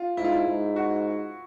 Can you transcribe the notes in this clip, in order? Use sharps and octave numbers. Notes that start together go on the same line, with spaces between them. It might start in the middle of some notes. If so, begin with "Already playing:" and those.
Already playing: F4
G#2 E4
F4
E4
G#2
F#4